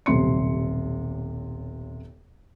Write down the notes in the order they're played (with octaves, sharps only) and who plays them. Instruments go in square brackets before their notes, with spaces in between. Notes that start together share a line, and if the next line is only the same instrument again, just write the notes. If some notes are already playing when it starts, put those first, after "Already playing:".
[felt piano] D#1 B1 C3 C6 C#7